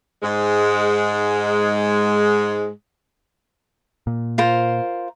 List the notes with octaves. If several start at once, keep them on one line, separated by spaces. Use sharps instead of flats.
G#2 G#3
A#2
F4 A#4 C5